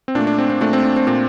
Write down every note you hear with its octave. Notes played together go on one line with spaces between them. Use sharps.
C4
A#2 A3 D4
D4
C4
C4
A#2 A3 D4
C4
D4
C4
A#2 A3 C4